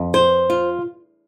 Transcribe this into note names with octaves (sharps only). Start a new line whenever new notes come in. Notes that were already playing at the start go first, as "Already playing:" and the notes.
Already playing: F2
C5
F4